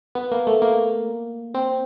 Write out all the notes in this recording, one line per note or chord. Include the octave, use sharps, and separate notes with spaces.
B3
A#3
A3
A#3
C4